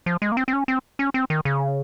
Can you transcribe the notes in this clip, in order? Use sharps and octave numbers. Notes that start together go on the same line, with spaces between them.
F3
G#3
A#3
C4
C4
C#4
C4
C#4
C4
D#3
C#3